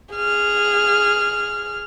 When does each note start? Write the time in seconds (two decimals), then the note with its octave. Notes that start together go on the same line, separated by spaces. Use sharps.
0.15 G#4 F6